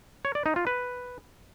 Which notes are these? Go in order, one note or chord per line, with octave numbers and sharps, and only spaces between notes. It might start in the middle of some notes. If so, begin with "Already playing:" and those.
C#5
D5
D#4
F4
B4